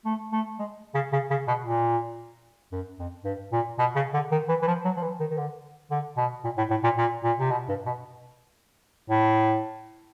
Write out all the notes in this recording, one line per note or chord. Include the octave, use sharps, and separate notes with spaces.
A3
A3
G#3
C#3
C#3
C#3
B2
A#2
F#2
F2
G2
A#2
B2
C#3
D3
D#3
E3
E3
F3
F#3
F3
E3
D#3
D#3
D3
D3
B2
A#2
A2
A2
A#2
A#2
A#2
C3
B2
G2
B2
A2